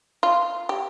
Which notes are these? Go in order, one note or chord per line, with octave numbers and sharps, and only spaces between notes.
F4
G4